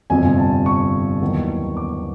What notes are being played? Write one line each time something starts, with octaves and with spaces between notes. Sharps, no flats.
G1 F2 C3 F3 G#5
A5
C#6
D#2 D#3 F#3 B3 E4
D6